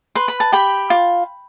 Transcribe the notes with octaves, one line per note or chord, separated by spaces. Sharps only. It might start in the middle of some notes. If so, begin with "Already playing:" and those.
B4 C6
B5
A5
G4 G5 B5
F4